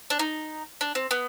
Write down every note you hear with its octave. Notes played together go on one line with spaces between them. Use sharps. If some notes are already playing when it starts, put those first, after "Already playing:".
D4
D#4
D4
C4
B3